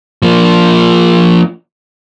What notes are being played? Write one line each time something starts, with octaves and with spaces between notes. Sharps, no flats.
F3 A#3